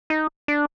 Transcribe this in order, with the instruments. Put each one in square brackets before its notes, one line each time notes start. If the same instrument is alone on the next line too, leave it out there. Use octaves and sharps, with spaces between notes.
[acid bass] D#4
D4